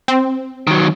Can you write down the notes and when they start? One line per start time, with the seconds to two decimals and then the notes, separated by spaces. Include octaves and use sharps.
0.08 C4
0.67 D#3 F#3